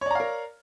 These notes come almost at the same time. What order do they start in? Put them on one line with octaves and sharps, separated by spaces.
C#5 D5 A#5 F5 A#4